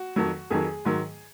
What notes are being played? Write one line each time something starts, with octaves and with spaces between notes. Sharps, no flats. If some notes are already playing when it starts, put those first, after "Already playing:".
Already playing: F#4
F2 D#3 F#3
F2 D#3 F#3 G#4
G#2 D#3 F#3